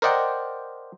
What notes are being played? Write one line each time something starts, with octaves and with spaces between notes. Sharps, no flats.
A#4 C5 D5 D#5 F#5 G5